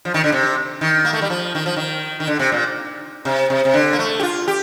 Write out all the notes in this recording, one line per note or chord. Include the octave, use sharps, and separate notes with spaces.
F3
D#3
D3
C3
D#3
A#3
A3
G3
F3
D#3
F3
D#3
D#3
D3
C3
A#2
C3
C3
C3
D3
A#3
A3
G4
F4
G4